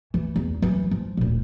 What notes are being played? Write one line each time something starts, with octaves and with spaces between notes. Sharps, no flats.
E3
E2
E3 F#3
F3
D1 A#2